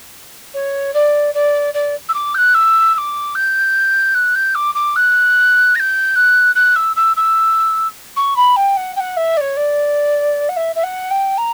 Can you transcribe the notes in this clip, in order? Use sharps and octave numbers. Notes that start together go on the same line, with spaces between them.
C#5
D5
D5
D5
E6
D6
G6
F#6
E6
E6
D6
G6
F#6
G6
D6
D6
F#6
A#6
G6
F#6
F#6
E6
E6
E6
C#6
B5
G5
F#5
G5
F#5
E5
D5
C#5
D5
F#5
E5
E5
F#5
G5
A#5